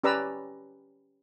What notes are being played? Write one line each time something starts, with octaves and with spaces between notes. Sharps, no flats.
C#4 G4 B4 D5 A#5 E6